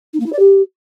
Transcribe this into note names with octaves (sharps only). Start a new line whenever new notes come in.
D#4
A#3
E4
D5
G4